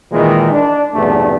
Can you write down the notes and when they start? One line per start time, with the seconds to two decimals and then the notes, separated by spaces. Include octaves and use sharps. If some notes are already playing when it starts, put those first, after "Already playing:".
0.12 A#2 D#3 E3 G#3
0.51 D4
0.95 B1 E2 G2 C3 A3